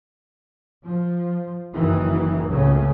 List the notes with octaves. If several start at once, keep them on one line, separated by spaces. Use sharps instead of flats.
F3
F#1 D#3 E3
C#2 A2 C#3 C#4